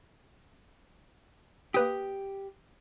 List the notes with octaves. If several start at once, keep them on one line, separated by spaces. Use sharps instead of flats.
A#3 G4 B4 D#6